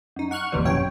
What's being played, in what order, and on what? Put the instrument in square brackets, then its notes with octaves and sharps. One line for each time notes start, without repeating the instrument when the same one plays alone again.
[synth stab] F#2 D#4
F#5 C#6 F6 F#6
G1 D#2 C3 E3 G3
F#2 B2 C#5 G5